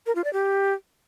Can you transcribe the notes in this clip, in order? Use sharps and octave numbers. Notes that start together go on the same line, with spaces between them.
A#4
F4
D5
G4